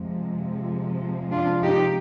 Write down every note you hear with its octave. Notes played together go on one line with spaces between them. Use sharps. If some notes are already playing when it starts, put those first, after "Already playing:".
Already playing: F2 C3 F3 G#3
D4 F4
D#4 G4